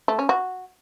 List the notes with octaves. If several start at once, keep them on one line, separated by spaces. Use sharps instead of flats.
A3
C#4
F#4